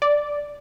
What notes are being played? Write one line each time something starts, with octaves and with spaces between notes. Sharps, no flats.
D5